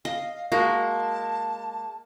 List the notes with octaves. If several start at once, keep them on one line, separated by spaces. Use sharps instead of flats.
D#5 F5
G#3 A#3 F#4 A5